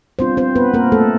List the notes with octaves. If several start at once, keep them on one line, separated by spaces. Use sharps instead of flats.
G3 B3 C4 D4 F4 C5
C4 C5
B3 B4
A#3 A#4
A3 A4